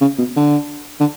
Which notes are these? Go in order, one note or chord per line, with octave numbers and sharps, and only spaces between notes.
C#3
B2
D3
D3